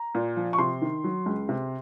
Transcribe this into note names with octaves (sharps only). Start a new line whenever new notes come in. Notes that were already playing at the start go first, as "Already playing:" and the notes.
Already playing: A#5
A#2
F3
C#6
C3 C6
D#3
F#3
C#2
C3